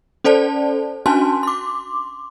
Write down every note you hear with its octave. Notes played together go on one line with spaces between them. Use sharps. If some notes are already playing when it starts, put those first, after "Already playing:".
C#4 A4 C5 D5 A5
C#4 D4 F#4 G#5 A5 C6
C6 D6